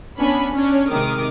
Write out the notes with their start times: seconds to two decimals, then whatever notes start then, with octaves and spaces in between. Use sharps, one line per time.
0.19 B3 C#4 D4 G#5 B5
0.52 C#4 D4
0.89 C3 D#3 G#3 A#4 D6 D#6